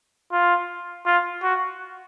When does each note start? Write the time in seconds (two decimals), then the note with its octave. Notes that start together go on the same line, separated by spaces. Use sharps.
0.32 F4
1.06 F4
1.43 F#4